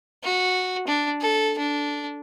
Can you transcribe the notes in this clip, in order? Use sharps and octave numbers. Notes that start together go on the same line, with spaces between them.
F#4
D4
A4
D4